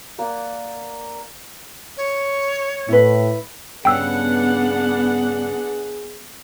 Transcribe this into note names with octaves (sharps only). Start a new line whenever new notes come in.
A#3 D5 F#5
C#5
A2 E4 B4
G2 C#3 B3 D4 G#4 F#5 G5 E6